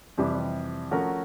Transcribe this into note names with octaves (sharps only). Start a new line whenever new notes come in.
F2 C3 E3 G3
F3 A3 C#4 F#4 A#4